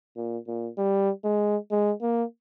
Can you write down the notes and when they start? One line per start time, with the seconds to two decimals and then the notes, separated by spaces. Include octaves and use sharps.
0.16 A#2
0.48 A#2
0.78 G3
1.24 G#3
1.71 G#3
2.02 A#3